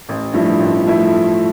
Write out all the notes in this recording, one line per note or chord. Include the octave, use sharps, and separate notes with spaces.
A1
G2 F3 A3 E4
A1
F3 A3 E4